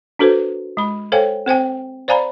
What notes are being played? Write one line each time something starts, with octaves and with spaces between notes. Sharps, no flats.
D4 F#4 A4 B4 C5
G#3 B5
A4 C5 C#5 F5 G5 G#5
C4 C5 G5 G#5
C5 D5 F5 G#5 A#5 B5